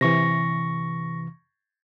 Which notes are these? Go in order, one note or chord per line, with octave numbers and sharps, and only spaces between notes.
C3 E3 C#6 A#6